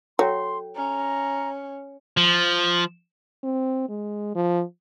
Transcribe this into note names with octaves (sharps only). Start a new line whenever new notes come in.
F#3 A4 C#5 G5 C6
C#4 A#5
F3
C4
G#3
F3